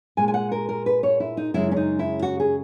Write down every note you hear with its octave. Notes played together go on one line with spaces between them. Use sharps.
A#2 G#3 G#5
G#5
F#5
A#4
A#4
B4
C#5
E4
D#4
F#2 C#3 G#3 E4
C#4
D#4
E4
F#4
G#4